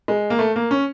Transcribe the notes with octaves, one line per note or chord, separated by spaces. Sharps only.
G#3
A#3
A3
A#3
C#4